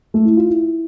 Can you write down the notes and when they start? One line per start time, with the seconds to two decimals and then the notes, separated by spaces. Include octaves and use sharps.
0.14 A3
0.25 E4
0.37 F4
0.48 E4